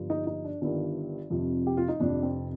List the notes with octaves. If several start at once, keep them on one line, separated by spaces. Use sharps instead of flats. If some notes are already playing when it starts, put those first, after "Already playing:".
Already playing: G1 G2 F3
D#4
D#4
D4
G1 G2 D#3 D4
F1 F2 C3 F3
G4
F4
D#4
F1 F2 C3 F3 D4
C4